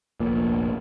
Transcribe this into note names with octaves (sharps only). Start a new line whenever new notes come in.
F1 A#1 A#2